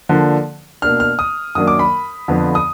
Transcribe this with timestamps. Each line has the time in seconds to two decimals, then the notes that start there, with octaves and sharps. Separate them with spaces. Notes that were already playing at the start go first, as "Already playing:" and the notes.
0.09 D3 F3 A#3 D4
0.82 B2 A#3 D4 F6
1.00 F6
1.19 D#6
1.55 F#2 D#3 F#3 A#3 D4 D#6
1.67 D6
1.79 B5
2.28 F2 D3 F3 B3
2.55 D#6